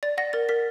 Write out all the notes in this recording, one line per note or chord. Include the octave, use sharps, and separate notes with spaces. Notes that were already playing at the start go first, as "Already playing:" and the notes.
D5 A6
F#5 A#6
A#4 A6
A#4 B6